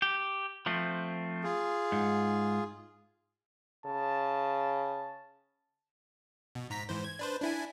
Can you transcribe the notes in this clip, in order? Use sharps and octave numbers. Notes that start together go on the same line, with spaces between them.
G4
F3 A3 C4
F4 G#4
G#2
C#3 A5
B2
G#2 A#5 B6
G#2 E3 C5
G#6
D4 B4 C5
D4 E4 G#5